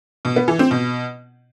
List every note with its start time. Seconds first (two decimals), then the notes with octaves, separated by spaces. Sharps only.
0.25 B2
0.36 B3
0.48 E3
0.59 C4
0.71 B2